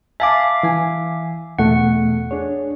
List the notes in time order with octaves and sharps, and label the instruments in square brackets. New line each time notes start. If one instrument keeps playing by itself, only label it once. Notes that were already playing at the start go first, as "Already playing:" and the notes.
[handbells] E5 F5 D6 [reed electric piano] G#5 A5
[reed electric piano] E3 G#5
[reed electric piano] E2 B2 A3 [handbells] F#5
[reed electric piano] D4 G#4 C#5